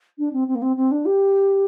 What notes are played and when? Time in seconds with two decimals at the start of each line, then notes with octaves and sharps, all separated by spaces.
0.19 D4
0.33 C4
0.48 C4
0.55 A#3
0.62 C4
0.77 C4
0.92 D4
1.06 G4